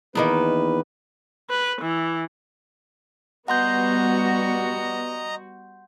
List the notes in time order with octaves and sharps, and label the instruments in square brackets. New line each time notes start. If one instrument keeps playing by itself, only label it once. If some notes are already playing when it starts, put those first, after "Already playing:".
[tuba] E2 [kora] D#3 A#3 B3 [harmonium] B4
[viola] B4
E3
[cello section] G3 F#4 [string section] B3 [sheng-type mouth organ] D#5 A#5 [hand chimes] F#5 C6 G6